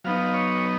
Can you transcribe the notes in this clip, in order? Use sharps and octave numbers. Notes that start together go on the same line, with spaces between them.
F#3 B3 D#4 F5
C#5